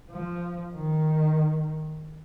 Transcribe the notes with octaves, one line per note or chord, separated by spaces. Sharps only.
F3
D#3